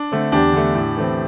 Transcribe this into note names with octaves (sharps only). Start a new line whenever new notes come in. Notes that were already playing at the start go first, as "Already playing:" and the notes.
Already playing: D4
D3 A3 C4
E2 D4 G4
D3 A3
A2
E3 A3 C4